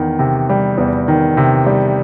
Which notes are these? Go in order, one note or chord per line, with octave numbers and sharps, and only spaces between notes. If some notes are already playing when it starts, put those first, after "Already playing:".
Already playing: E2 D#3
C3
G3
E2
D#3
C3
G3